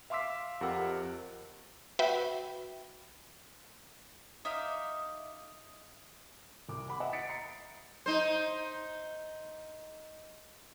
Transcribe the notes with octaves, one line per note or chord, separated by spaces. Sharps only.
E5 F5 C6 D6 E6 B6
F2 G4 A#4 F#5 E6
F#4 B4 E5 G5 B5
D#4 E5 F5 D6
C2 D6
F#5 B5 D6
D#5 E5 F#5
D#6 A6 B6 C#7 D7
A#5 C7 C#7
D#4 C5